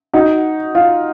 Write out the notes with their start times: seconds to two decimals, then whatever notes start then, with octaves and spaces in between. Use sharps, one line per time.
0.13 D#4 F#4
0.75 F4